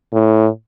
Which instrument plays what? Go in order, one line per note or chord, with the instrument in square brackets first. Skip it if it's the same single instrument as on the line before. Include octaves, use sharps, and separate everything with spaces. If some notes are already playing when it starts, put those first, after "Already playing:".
[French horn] A2